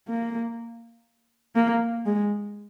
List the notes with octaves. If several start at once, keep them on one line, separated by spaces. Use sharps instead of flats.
A#3
A#3
G#3